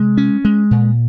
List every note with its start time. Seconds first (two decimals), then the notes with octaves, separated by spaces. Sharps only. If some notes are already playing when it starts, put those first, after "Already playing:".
Already playing: C3 G#3
0.17 C#4
0.45 G#3
0.71 A#2